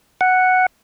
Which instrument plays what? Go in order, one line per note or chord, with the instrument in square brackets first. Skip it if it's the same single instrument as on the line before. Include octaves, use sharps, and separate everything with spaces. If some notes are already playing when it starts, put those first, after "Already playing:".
[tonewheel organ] F#5